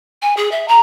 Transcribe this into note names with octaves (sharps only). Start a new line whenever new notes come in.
G#5
G#4
E5
A#5